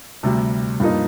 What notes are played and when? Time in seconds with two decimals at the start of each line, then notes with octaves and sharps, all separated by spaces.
0.23 D2 C3 G3
0.80 G2 F3 A#3 D#4